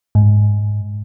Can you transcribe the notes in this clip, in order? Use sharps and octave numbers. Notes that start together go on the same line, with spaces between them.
G#2